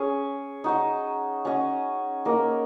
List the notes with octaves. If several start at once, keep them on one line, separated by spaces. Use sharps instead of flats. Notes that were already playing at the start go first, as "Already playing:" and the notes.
Already playing: C#4 G#4 C#5
D#4 F#4 D#5
C#4 F#4 D#5
A#3 D#4 A#4 D#5